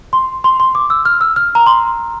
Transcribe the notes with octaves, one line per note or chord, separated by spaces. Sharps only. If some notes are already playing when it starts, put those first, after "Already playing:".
C6
C6
C6
D6
E6
F6
E6
F6
A#5
C6